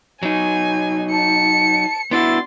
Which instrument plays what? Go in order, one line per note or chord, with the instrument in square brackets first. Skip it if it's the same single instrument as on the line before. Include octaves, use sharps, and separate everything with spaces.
[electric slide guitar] F#3 D#4 [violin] G#5
[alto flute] A5 [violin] C#7
[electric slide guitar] B3 D4 F#4 [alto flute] E4 [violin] C6 A6